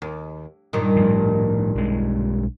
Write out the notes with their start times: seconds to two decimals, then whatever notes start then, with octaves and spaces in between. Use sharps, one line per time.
0.02 D#2
0.73 G2 A#2 D#3
0.97 A2 F3
1.76 B1 G#3